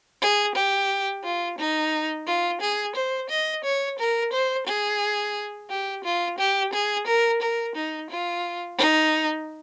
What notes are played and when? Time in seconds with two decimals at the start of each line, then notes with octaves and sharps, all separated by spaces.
0.21 G#4
0.55 G4
1.24 F4
1.58 D#4
2.27 F4
2.61 G#4
2.95 C5
3.30 D#5
3.64 C#5
3.99 A#4
4.32 C5
4.67 G#4
5.70 G4
6.04 F4
6.38 G4
6.73 G#4
7.07 A#4
7.42 A#4
7.75 D#4
8.10 F4
8.78 D#4